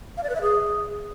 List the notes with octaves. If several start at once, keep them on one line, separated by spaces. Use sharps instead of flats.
F5
D5
B4
E5
G#4